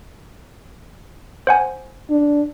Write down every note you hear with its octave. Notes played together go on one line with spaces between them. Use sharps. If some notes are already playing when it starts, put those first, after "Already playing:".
C5 F#5 G#5
D4